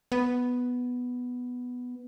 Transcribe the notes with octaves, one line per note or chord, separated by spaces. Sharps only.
B3